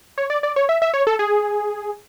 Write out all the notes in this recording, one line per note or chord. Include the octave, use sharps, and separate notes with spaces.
C#5
D5
D5
C#5
E5
E5
C#5
A4
G#4